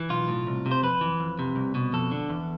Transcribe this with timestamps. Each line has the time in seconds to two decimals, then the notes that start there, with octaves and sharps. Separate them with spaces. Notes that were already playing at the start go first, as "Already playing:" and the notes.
Already playing: E3
0.10 B1 F4
0.28 A2
0.47 C2
0.66 C3
0.71 C5
0.83 F2 B4
1.01 E3
1.20 F2
1.39 C3
1.56 C2
1.75 B2
1.93 F2 A4
2.12 D3
2.30 E2